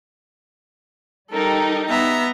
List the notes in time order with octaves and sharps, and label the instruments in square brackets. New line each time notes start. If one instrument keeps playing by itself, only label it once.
[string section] G3 D#4 G4 [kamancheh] A4 A#4
[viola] B3 A#5 [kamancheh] E5